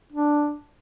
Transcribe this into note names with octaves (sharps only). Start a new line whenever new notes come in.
D4